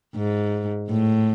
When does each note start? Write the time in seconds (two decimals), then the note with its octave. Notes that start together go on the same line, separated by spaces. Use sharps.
0.15 G#2
0.89 A2